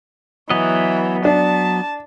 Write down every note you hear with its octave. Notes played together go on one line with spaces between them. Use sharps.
E3 F#3 B3 D#5
D4 A5